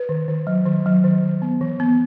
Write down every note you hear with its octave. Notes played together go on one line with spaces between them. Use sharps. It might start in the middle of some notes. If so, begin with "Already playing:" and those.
Already playing: B4
D#3
D#3
F#3
D#3
F#3
D#3
D#3
B3
E3
B3